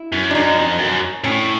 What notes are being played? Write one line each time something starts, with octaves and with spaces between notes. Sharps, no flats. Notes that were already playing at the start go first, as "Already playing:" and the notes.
Already playing: E4
F#2
D4
F#2 D#4
F2
F#2
A2 C#4